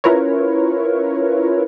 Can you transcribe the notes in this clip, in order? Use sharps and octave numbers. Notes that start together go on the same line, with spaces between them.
C#4 E4 F4 A#4 B4 C#5